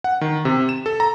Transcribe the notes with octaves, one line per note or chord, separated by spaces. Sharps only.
F#5
D#3
C3
E7
A4
A#5